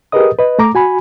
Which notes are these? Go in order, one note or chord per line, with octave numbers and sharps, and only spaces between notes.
G4 G#4 A#4 B4 D#5 D#6
B4 D#5
A3 A#5 D6
F#4 G#5 B5